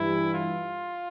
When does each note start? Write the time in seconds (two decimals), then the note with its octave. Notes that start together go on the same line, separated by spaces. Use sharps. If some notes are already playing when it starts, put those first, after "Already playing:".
Already playing: G2 E3 G3 E4
0.34 F4